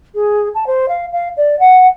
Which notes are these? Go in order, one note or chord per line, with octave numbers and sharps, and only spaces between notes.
G#4
A5
C5
F5
F5
D5
F#5